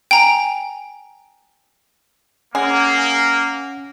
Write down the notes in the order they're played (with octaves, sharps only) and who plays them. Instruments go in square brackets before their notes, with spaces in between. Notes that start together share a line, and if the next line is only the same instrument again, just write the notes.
[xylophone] G5 G#5 A#5
[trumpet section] A#3 [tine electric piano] C#4 F#5 [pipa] G#4